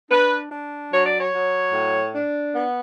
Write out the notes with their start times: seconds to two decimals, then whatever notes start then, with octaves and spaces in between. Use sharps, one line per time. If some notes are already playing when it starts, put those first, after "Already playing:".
0.11 D4 B4
0.51 D4
0.92 F#3 C#5
1.05 D5
1.17 C#5
1.33 F#3
1.73 A2
2.14 D4
2.55 B3